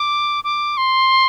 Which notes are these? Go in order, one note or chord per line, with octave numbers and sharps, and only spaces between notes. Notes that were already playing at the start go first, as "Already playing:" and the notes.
Already playing: D6
D6
C6